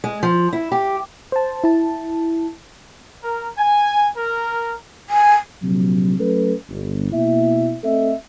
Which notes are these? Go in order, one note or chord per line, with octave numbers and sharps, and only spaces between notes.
G#3
F3
E4
G4
C5 A5
E4 A5
A#4
G#5
A#4
G#5
A#1 C3 F#3
F#3 A3 C#4 A4 B4
G1
B2 A#3 E4 E5
A3 C4 A4 D#5 E5